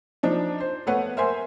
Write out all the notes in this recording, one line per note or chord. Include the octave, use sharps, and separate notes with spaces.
F3 D4 D#4
C5
A3 B3 B4 C#5 F#5
A#4 C5 E5 G#5 C6